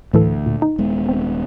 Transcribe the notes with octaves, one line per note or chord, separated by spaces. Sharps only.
D2 A2 E3 A4
A#2
D#4
D#1 G#3 B3
C4